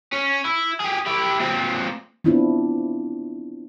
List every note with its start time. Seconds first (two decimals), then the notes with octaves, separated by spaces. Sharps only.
0.13 C#4
0.45 E4
0.80 G4 G#4
1.06 E4 G4
1.40 A#2 C4
2.24 B3 C4 D4 E4 F4